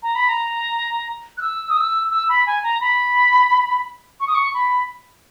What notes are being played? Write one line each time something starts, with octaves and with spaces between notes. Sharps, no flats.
A#5
B5
A#5
F#6
E6
D#6
E6
E6
B5
G#5
A#5
B5
C#6
D#6
C#6
B5